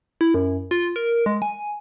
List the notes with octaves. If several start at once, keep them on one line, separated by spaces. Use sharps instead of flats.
E4
F#2
F4
A#4
G#3
G#5